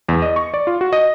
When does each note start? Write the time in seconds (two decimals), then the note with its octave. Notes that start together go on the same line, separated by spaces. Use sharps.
0.09 E2
0.22 D#5
0.36 C#6
0.54 D5
0.67 F4
0.81 F#4
0.93 D#5